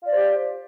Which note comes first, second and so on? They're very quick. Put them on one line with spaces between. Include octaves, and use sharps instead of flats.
F4 D5 C5 G4